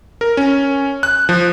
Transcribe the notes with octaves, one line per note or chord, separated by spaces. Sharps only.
A#4
C#4
F#6
F3